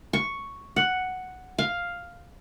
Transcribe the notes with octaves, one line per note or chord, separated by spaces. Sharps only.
C#6
F#5
F5